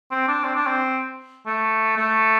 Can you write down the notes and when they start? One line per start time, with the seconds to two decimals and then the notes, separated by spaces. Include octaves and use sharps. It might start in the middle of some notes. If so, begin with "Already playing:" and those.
0.11 C4
0.27 D4
0.44 C4
0.55 D4
0.67 C4
1.46 A3
1.97 A3